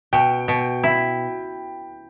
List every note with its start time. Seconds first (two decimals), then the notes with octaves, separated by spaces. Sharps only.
0.13 B2 G5
0.48 B2
0.84 E4